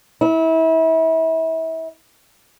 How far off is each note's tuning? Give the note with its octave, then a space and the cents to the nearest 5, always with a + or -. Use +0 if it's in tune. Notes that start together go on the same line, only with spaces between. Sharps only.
E4 -30